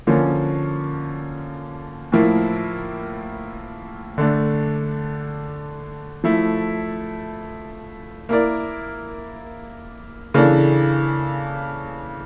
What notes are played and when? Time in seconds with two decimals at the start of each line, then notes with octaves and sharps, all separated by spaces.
0.07 D3 F3 A#3 C#4
2.12 A2 F3 A#3 E4
4.18 D3 A3 D4
6.24 F3 A3 E4
8.29 A#3 E4 A#4 D5
10.34 C#3 E3 A#3 D4 A4